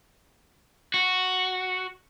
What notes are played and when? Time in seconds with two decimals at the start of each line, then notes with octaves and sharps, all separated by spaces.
0.94 F#4